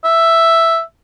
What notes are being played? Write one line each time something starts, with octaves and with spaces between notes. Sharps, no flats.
E5